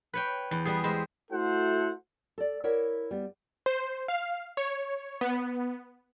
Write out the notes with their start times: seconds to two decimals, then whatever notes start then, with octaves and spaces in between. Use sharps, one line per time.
0.14 B4 C#5 G5
0.51 E2
0.65 G3 B3 G#4
0.84 G#3 C5 E5
1.31 A3 E4 F#4 A4 C5 F#5
2.38 A4 D5
2.64 E4 A#4 C#5 D5 E5 F#5
3.11 G3 B3
3.66 C5
4.08 F5
4.57 C#5
5.21 B3